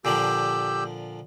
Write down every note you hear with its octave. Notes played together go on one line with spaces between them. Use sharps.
A#2 D3 F3 G4 E6 G6